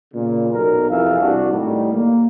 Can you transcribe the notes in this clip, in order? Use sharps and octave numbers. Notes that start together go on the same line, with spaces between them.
A#2 C#3
B1 A#4
F2 C3 E3 G#4 E5 F5
C2 D4 F#4
A2 D#3 G3
A#3